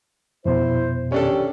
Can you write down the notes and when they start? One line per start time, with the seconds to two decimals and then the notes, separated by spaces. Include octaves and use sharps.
0.45 F2 B2 E4 C5
1.12 D2 D#3 C#4 D4 G4 A4